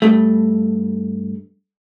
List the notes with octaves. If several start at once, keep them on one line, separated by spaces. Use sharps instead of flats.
G2 A3